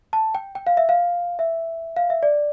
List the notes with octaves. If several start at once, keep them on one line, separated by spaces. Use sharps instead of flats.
A5
G5
G5
F5
E5
F5
E5
F5
E5
D5